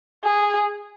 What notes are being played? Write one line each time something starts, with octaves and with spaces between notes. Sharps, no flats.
G#4